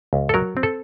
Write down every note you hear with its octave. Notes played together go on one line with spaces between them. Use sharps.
C#2
A4
F#3 A#4
C4
A4